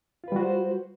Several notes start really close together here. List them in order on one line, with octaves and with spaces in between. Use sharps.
F4 B4 G3 F#4 C5